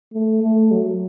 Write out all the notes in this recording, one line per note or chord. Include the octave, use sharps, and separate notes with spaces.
A3
A3
F#3